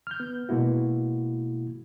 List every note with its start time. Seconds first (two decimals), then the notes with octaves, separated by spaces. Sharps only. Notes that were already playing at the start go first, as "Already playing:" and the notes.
0.07 F6 G6
0.20 B3
0.49 B2 G#3 A#3 E4 F#4